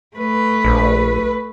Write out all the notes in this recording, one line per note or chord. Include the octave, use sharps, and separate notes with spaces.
A3 B4
A#1